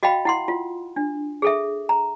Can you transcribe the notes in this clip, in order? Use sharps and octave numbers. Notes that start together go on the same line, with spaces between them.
F#4 D#5 F5 G5 B5
E4 F#5 C6
F4
D4
G#4 A4 E5
A#5